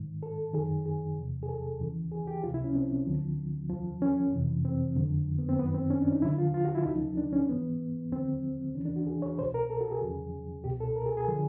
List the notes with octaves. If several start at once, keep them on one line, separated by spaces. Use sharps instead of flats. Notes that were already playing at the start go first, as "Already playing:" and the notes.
Already playing: G#2 D#3
A4
F#2 D#3 G#4
G#4
E2 C3 F3
G#4
A4
D#2 C#3 E3
G#4
G4
C#2 C3 F3 F4
E4
C#4
C4
D2 D3 F3
D#2 C#3 F3
C#4
F2 C3 E3
C4
F2 D3 F3
B3
C4
F#2 D#3 B3
C4
C#4
D4
D#4
D#2 D3 F3 E4
F4
F4
F#4
E4
D2 C#3 F3 D#4
D4
C#4
G#2 E3 B3
D#2 D3 F3 C4
D#2 C#3 E3 C#4
D4
F#4
G#4
C#5
C2 B2 C5
A#4
A4
F#4
G#4
E2 C#3 F3
C#2 B2 G4
A4
A#4
G#4
G#4
D3 F3